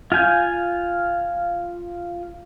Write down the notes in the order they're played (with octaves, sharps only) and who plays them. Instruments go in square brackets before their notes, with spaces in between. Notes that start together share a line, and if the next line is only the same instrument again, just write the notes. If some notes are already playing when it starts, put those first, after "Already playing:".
[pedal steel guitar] F4 F5 G#5 G6